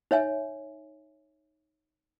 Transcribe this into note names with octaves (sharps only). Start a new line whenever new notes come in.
D#4 C#5 E5 G#5